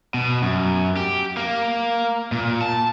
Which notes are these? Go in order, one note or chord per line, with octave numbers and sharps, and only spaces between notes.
B2
F#2
G4
A#3
A#2
A5